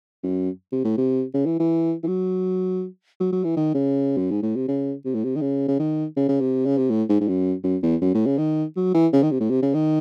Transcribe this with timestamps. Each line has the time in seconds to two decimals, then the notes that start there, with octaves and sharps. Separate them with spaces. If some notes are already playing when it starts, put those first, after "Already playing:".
0.23 F#2
0.72 C3
0.85 A2
0.98 C3
1.34 C#3
1.46 E3
1.59 E3
2.03 E3
2.08 F#3
3.20 F#3
3.32 F#3
3.44 E3
3.57 D#3
3.75 C#3
4.17 F#2
4.31 G#2
4.43 A2
4.56 C3
4.68 C#3
5.05 C3
5.15 A2
5.24 C3
5.36 D#3
5.41 C#3
5.68 C#3
5.79 D#3
6.17 C#3
6.29 C#3
6.41 C3
6.66 C#3
6.78 C3
6.90 A2
7.09 G#2
7.21 G#2
7.28 F#2
7.64 F#2
7.83 E2
8.02 F#2
8.15 A2
8.26 C#3
8.38 D#3
8.76 F#3
8.94 E3
9.13 C#3
9.23 D#3
9.31 C3
9.40 A2
9.50 C3
9.62 C#3
9.74 D#3